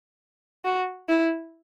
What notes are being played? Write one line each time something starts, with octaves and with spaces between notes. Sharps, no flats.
F#4
E4